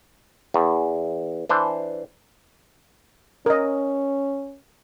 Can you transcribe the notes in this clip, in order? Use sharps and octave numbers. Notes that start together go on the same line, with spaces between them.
E2
E3 D4 C5
C#4 A#4 D#5